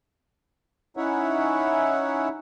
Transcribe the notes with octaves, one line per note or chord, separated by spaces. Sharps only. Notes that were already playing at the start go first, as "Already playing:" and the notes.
C#4 D#4 E4 C#5 E5 F#5